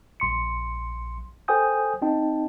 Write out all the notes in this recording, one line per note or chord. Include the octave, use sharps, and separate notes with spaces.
A#1 C6 C#7
A4 C5 G5 G#5 D#6 G6
C4 D#4 D#5 G5 A5